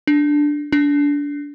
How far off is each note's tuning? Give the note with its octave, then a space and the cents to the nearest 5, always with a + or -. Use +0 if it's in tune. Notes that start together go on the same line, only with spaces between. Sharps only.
D4 +0
D4 -25